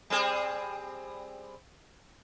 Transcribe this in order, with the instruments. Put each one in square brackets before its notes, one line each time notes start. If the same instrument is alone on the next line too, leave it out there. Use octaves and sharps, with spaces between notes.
[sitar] G3 C4 G#4